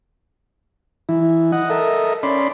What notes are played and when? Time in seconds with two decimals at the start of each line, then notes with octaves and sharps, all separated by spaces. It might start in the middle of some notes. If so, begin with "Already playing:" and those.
1.09 E3 E4
1.52 D#5 F#5
1.70 A4 A#4 D#5 E5
2.23 C#4 D5 B5 C6